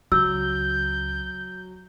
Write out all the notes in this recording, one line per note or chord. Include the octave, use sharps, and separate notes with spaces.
C#2 F#3 E6 G6